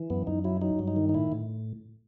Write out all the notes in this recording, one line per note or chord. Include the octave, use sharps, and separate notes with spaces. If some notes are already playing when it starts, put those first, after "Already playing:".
Already playing: E3
F#2 B3
F#2 D#4
F#3 E4
F#3 D#4
G2
D#4
D#3
D#4
A2 E4
A2